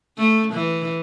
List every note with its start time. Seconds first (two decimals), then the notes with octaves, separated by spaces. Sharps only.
0.18 A3
0.53 E3